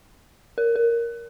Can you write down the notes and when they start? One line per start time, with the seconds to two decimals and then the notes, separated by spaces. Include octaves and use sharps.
0.58 A#4
0.76 A#4